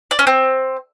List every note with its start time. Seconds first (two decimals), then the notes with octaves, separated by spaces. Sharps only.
0.11 D5
0.19 C#4
0.27 C4